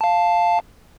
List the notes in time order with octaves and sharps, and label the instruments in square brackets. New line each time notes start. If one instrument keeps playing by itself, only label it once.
[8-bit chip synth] F5 A5